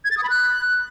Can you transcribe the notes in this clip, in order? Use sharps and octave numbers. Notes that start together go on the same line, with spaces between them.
G#6
A6
D#6
B5
F#6